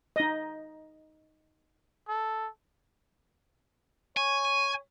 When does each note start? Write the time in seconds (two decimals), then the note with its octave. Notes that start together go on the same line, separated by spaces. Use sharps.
0.16 D#4 D#5
2.08 A4
4.17 C#5 G#5